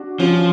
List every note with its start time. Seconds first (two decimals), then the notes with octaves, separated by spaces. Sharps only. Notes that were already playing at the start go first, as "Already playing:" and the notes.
Already playing: D4 F#4
0.20 F3 C#4 F4